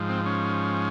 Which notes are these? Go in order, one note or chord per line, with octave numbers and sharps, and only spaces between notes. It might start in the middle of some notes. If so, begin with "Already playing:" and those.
Already playing: G#2 F3
C4
C#4